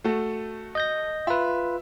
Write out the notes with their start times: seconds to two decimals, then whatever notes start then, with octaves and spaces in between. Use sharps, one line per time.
0.04 A3 F#4 A4
0.75 D#5 G6 A#6
1.27 F4 B4 E5